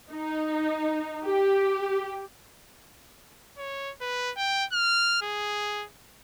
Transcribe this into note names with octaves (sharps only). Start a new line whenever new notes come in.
D#4
G4
C#5
B4
G5
F6
G#4